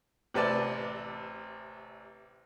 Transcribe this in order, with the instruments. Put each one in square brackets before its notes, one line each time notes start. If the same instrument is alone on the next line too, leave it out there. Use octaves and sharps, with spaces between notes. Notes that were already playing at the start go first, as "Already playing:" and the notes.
[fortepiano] A1 C3 B4 D5 A5